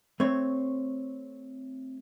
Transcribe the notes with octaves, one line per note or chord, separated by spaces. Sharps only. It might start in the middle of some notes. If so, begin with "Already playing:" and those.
A3 C4 C#5